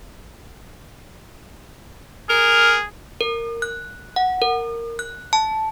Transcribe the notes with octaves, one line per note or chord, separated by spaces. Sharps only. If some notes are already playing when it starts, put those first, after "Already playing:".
G#4 A#4 F6
A#4
F#6
F#5
A#4
F#6
A5